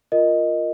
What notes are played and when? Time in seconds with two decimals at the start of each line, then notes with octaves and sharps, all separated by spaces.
0.12 F4 A#4 D#5